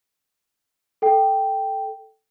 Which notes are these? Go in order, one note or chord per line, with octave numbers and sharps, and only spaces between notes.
A4 G5